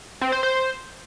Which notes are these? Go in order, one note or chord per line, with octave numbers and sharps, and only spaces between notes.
C4
C5
C5